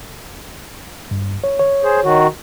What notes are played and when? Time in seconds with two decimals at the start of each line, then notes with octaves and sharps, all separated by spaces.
1.11 G2
1.44 C#5
1.59 C#5
1.84 G#4 C5
2.04 D#3 F#4